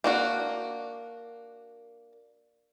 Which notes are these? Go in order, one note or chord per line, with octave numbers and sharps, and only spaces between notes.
A#3 D4 F#4